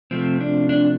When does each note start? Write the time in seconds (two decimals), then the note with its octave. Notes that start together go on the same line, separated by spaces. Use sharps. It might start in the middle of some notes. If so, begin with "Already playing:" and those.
0.11 C3 F3 A3 C4
0.41 D4
0.69 D4